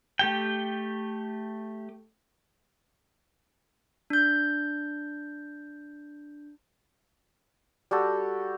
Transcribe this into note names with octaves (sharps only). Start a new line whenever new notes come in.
A3 G4 G5
D4 G6
G3 F#4 G4 A4